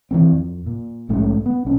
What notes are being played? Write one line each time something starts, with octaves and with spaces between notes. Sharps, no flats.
E3 F3 C4
F2
A#2
A#1 G#2 A3 C#4
B3
B1 C#4